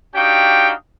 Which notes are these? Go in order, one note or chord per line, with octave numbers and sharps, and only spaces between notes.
D4 D#4 F#4 G4 F5 G5